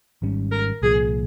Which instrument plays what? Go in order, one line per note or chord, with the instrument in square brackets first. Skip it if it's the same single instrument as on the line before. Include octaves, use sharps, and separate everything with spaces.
[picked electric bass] G#1 G#2 G3 C#4
[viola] A#4
[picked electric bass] C2 A#2 F3 [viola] G#4